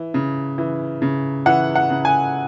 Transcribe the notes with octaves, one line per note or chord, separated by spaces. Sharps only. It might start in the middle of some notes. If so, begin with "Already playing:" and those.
Already playing: E3
C#3
E3
C#3
E3 F#5
F#5
C#3
G#5